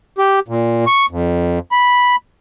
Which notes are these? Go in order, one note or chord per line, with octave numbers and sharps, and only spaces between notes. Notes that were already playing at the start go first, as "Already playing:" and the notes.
G4
A#2
C#6
F2
B5